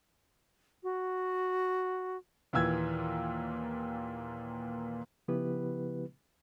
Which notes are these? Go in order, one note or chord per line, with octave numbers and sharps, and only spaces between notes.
F#4
D#2 A#2 E3 E6 G#6
C#3 F3 B3 E4 G4 B4